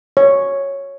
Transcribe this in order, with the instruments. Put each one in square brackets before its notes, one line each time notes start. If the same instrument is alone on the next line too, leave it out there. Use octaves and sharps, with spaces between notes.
[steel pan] C#5